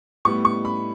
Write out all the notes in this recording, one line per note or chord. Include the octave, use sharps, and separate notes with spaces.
A2 G3 B3 C#6
C#6
B5